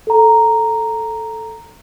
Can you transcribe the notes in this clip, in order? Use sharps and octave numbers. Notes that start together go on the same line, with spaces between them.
A4 A#5